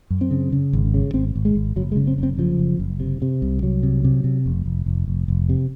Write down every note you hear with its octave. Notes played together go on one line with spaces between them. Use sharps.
F#2
C4
C#3
C#3
G#1
C#3
G#1 C4
G#1
G#3
G#1
F#1 F#3
G#3
C#3
C4
F#1 C4
C#3 F3
F#1
F#1
C3
C3
C2
C2 F#3
C3
C3
C3
F1
F1
F1
F1
F1
C3